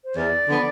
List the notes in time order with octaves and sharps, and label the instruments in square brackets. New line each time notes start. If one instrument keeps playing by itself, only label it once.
[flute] C5
[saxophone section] E2 [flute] D5
[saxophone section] D3 F3 B3